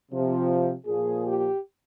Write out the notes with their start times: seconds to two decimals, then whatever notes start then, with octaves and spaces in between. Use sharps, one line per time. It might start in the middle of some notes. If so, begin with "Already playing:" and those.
0.11 C3 F3
0.86 A#2 F3 G#4
1.24 G4